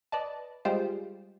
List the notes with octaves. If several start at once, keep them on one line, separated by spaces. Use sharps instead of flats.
B4 D5 D#5 A5
G3 G#3 F4 G4 C5